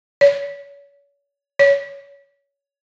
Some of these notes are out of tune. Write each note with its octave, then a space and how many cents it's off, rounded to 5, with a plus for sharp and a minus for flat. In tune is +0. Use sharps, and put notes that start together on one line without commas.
C#5 +35
C#5 +20